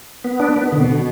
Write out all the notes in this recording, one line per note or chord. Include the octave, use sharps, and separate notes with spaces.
B3
D4
B3
B2 D3
D3